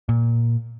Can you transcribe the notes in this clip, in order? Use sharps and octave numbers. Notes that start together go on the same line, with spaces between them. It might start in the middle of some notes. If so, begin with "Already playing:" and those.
A#2